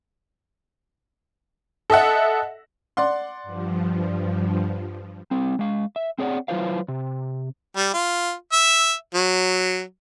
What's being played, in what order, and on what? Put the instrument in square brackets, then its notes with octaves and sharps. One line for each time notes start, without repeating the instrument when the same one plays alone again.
[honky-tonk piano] A4 D#5 E5 F#5
[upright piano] D5 F#5 C6
[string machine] G2 F3
[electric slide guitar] G3 C4
G#3 F5
E5
C4 G#4 C#5 D5 F#5
F#3 E4 F4 B4 C5 F5
C3
[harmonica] G3
F4
E5
F#3